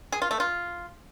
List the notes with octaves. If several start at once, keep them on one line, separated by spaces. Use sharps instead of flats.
G#4
F4
A3
F4